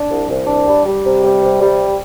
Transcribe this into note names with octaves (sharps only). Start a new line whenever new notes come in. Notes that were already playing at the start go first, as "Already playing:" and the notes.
Already playing: D4
C2
C2
D4
G3
G3
C3
G3
C3
G3